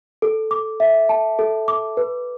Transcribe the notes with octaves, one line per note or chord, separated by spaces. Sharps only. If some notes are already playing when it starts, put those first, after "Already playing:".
A4
D6
E5
A5
A4
D6
B4